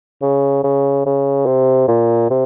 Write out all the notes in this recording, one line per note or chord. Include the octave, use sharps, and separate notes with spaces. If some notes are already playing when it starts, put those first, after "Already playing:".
C#3
C#3
C#3
C3
A#2
C3